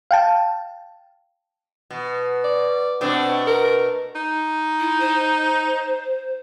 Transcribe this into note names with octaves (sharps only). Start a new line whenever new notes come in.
F5 G5 A5
B2
D5
B2 A3 C4 D4
A#4
D#4
E4
C5